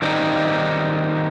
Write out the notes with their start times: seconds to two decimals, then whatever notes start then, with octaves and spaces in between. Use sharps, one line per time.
0.02 D#3 G3 C4 D#4